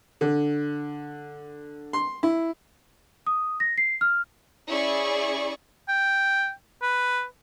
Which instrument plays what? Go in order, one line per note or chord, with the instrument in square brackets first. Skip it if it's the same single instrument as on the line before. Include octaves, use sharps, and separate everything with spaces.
[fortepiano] D3
C6
E4
[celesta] D#6
A#6
C7
F6
[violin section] C#4 E4 G#4 D5 C#6
[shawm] G5
B4